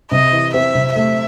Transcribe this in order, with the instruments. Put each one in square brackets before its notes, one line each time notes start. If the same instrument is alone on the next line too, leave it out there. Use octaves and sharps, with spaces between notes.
[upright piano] C3 [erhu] D#5
[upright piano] E3
[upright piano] C4 [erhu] E5
[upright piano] C3
[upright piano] A3 [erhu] E5